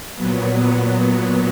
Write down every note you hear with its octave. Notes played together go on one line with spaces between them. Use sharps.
A#2 F#3 B3